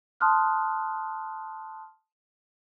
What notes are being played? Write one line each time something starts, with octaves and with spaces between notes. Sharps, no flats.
A5 C6 D#6 F6 F#6